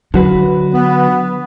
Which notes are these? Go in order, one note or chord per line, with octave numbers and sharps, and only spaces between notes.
D3 F#3 F#4 B4
B3